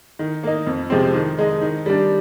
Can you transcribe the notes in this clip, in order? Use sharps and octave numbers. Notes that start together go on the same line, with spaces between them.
D#3
A#3 D#4
F2
C3 F3 G#3 C4
D#3
G#3 D#4
D#3
G3 D4